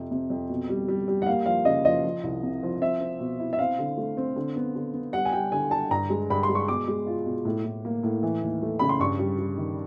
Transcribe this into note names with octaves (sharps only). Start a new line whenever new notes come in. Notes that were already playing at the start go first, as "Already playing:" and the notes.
Already playing: F2 C3
C3
F2
B2
G3
G3
G3
F#5
A#3 F5
F3 F5
C#3 D#5
F3 D#5
F3
C2
C3
F3
C4 E5
C4
B2
E4
E5
C4 F5
D3
A3
C4
D3
B3
D3
B3
G3 F#5
G#5
G3 G5
D3 G#5
G3 A5
G2 A#5
G#3
G2 B5
C6
G#3
C#6
B2 D6
G#3
F4
B2
A2
A2
A#3
A2
E3
D#2
A3
C#3 B5
C6
G2 C#6
G3
G3
D#3